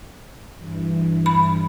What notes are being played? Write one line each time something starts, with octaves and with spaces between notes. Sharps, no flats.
G2 E3
B5